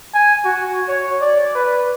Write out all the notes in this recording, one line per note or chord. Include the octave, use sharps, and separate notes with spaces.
G#5
F#4
C#5
D5
B4